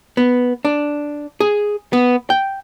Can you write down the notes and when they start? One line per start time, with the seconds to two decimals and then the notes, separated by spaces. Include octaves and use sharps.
0.17 B3
0.65 D4
1.40 G#4
1.93 B3
2.30 G5